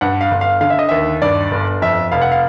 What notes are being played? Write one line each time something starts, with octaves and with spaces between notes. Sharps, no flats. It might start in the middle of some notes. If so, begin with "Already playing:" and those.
G2 F#5
F5
G1
F5
D3 F5
E5
D#5
D#2 E5
G2 D5
G1
F2 E5
F1 F5
F#5
F5